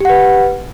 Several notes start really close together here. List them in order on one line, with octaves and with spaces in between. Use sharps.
G4 F#5 B4